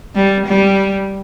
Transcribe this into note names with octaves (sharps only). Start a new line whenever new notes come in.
G3
G3